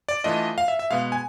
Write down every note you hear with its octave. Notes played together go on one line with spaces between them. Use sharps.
D5
E3 A3 D4 F4 D#5
F5
E5
E5
B2 G#3 B3 F5
G#5